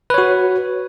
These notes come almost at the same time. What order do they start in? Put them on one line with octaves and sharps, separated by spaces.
B4 C#5 F#4